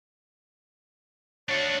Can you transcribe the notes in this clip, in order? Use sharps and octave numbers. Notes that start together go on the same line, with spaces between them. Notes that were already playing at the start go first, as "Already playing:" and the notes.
D4 F#4 C#5